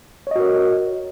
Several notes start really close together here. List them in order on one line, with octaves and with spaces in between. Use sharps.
C#5 D#5 F#4 A#4